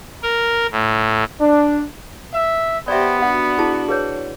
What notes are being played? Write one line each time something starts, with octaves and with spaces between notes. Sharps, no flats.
A#4
A2
D4
E5
B3 G4 C5 D5 E5
D4 F#4 F#5
E4 G#4 A5
G#4 B4 C#5